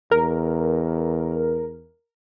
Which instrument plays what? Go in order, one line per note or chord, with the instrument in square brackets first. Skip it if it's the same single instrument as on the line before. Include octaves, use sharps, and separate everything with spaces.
[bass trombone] E2 [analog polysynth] A#4